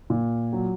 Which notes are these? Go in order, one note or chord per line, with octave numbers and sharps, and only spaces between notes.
A#2
F#3